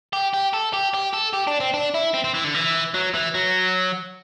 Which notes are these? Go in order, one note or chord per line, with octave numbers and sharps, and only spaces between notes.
G4
G4
A4
G4
G4
A4
G4
D4
C4
D4
E4
C4
C4
E3
D3
E3
F#3
E3
F#3